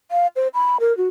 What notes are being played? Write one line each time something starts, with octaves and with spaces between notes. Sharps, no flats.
F5
C5
B5
A#4
F#4